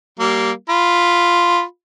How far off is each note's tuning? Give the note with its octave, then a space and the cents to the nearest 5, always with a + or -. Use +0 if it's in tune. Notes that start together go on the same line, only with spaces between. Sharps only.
G3 -25 A#3 -5
F4 +0 B5 +0